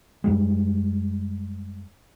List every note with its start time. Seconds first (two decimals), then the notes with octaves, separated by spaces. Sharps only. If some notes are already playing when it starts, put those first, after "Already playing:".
0.24 F#2 G3 G#3